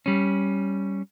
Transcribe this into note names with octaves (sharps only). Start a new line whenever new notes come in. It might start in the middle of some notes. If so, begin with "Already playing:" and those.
G3 C#4